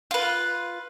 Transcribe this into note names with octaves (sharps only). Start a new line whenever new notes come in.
F4 B4